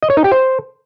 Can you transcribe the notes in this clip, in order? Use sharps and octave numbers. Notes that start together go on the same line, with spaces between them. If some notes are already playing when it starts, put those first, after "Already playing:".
D#5
C#5
D#4
G4
C5